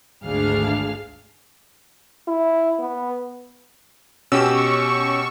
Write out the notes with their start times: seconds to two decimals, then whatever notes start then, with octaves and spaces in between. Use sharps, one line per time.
0.24 G#1 D2 D4 G#4 F5 F6
2.28 E4
2.80 B3
4.32 B2 C#4 G4 E6
4.56 C#6